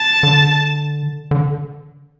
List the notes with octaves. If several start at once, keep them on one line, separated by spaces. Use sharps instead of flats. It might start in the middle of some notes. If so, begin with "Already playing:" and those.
Already playing: A5
D3
D3